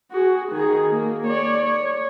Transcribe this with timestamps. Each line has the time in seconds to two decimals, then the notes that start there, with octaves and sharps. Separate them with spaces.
0.11 F#4 G#4
0.52 D#3 G#4
0.90 A#3
1.27 C#5 D5
1.62 C#5